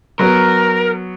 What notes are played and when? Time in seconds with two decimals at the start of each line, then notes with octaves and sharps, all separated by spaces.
0.19 F#3 B3 A#4